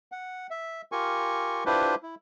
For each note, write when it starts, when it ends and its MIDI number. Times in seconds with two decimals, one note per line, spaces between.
0.12 0.47 78
0.50 0.82 76
0.92 1.64 65
0.92 1.64 67
0.92 1.64 70
0.92 1.64 80
0.92 1.64 85
1.66 1.95 62
1.66 1.95 64
1.66 1.95 65
1.66 1.95 67
1.66 1.95 71
1.66 1.95 72
2.03 2.15 64